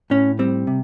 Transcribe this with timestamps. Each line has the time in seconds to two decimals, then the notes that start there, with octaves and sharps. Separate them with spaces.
0.10 A2 C#4
0.39 G3 C4
0.67 C3